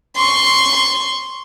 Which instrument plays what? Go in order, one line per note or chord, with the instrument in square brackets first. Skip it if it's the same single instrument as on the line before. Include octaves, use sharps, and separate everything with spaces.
[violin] C6 C#6